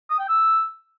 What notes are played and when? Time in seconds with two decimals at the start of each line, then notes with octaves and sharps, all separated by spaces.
0.10 D#6
0.19 G5
0.29 E6